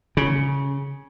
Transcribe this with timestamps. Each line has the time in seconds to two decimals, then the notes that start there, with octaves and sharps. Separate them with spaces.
0.17 C#3